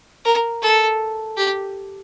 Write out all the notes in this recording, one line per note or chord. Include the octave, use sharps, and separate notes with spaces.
A#4
A4
G4